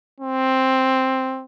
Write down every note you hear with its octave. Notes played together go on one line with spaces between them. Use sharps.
C4